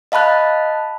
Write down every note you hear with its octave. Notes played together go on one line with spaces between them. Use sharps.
D#5 F5 A5 B5 F#6